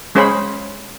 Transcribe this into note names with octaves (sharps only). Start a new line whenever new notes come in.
G#3 C#4 G#4 C5 F5 B5